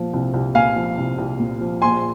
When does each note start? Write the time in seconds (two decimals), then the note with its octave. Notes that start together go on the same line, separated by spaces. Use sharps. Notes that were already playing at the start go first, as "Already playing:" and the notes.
Already playing: A#2 F3
0.13 C2
0.34 C2
0.55 A#2 F5 G#5
0.76 F3
0.98 C2
1.18 C2
1.39 A#2
1.61 F3
1.82 A#1 G#5 C6